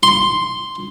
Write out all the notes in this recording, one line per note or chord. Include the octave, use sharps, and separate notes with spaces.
C6